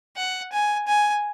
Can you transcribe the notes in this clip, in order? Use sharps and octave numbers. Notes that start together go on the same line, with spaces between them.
F#5
G#5
G#5